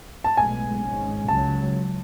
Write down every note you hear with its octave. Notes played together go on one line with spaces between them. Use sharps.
A5
B1 A2 G#3 B3 G#5
G#1 G#2 G#3 C#4
C#2 C#3 F#3 A5